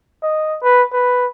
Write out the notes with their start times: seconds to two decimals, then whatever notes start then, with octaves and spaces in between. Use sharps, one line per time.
0.23 D#5
0.62 B4
0.93 B4